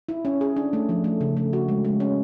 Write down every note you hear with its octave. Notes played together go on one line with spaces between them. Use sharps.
E4
C#4
G#4
D4
A3
F3
A3
C#3
A3
F#4
G#3
G#3
C#4